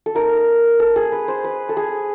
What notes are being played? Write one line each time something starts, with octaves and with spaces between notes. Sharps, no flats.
A4
A#3 D#4 A#4
A4
G#4
B4
C5
B4
A4
G#4